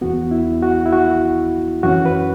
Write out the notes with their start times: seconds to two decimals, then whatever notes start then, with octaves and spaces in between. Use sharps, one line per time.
0.01 E2 E3 B3 F#4
0.31 E4
0.62 F#4
0.86 E4
0.93 F#4
1.83 F#2 E3 C#4 F#4
2.06 B4